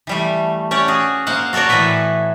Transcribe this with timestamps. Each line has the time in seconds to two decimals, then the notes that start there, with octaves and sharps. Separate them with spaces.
0.07 E3 G3 A3
0.71 C#4 G4 C#5 D5 F#5
0.88 F#4 G#4
1.27 A#3 C5 F5 F#5
1.53 F#4 A4 A#4 C#5 D5
1.69 A2 E3 E4 A4 B4 E5